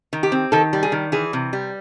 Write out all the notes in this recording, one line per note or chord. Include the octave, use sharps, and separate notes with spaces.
D#3
G4
C4
D#3 A4
G3
G#4
D#3
E3 G#4
C3
G3